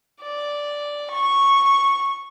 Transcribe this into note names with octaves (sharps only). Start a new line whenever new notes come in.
D5
C#6